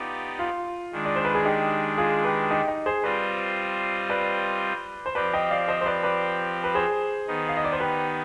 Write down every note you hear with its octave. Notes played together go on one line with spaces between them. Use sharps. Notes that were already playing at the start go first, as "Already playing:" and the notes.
Already playing: B3 D#4 F4 G4 D5
F4
D#3 G#3 D4
D5
C5
B4
G#4
D#4 G4
F4 G#4
G4 B4
D#4 G4
D#4
G#4 C5
G3 C4 F4 B4 C5 D5 D#5
B4 D5
C5
F3 C4 G4 B4 D5
D#5 G5
D5 F5
C5 D#5
C5
B4 D5
B4 D5
B4
G#4 C5
D#3 B3 D#4
F5
D#5
D5
C5
G4 B4